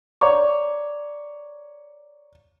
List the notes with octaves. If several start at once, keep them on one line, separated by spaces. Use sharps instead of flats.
C#5 D5 A#5 C#6 D6